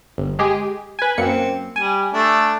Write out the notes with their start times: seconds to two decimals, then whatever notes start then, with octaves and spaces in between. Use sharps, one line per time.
0.18 G1
0.39 G#3 G4 G#4
0.99 B4 G#5
1.18 F#2 A#3 C4 C#7
1.76 G3 G#5
2.13 A3 D4